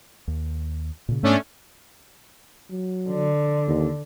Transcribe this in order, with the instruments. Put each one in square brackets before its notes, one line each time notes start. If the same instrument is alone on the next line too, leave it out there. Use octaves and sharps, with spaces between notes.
[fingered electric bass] D#2
A#2 C#3
[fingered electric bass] G#2 B3 [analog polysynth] A3 C#4 D4
[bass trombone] F#3
[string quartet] D3
[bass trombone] D#2